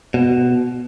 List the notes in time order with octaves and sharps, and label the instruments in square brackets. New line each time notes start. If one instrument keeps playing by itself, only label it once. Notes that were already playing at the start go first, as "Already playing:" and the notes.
[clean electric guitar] B2